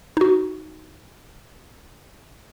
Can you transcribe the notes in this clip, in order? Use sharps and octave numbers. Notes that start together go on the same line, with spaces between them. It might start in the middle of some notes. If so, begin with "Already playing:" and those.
D#4 F#4